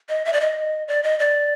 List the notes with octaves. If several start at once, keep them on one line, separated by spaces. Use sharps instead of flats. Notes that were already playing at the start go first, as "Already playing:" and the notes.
D#5
E5
D5
D#5
D5
D#5
D5